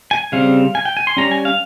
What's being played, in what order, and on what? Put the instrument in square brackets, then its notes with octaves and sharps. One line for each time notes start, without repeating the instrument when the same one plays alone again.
[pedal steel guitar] G#5
C#3 G3 C4 F5
G#5
G5
G#5
C6
G3 C#4 A#5
G#5
F5